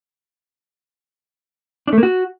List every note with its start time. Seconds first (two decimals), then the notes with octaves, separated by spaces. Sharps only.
1.87 D4
1.93 A3
1.98 A#3
2.03 F#4